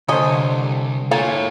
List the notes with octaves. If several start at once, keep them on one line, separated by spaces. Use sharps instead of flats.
C2 D3 C5 C#5 D#5 G#5
A#3 F4 A4 C#5 G#5